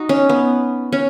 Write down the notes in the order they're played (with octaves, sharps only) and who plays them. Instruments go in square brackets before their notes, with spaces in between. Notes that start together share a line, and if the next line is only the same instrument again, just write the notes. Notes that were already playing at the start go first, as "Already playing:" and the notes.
Already playing: [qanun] D#4 F#4
C#4
B3
C#4